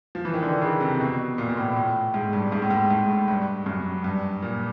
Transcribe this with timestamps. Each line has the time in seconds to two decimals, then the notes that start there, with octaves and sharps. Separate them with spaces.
0.15 F3
0.25 E3
0.34 D#3
0.43 D3
0.62 C#3
0.80 C3
1.00 B2
1.38 A#2
1.49 A#2
1.57 A2
1.76 A2
2.14 G#2
2.33 G2
2.52 G#2
2.62 A2
2.71 G#2
2.90 G#2
3.09 A2
3.28 G2
3.66 F#2
4.04 G2
4.42 A#2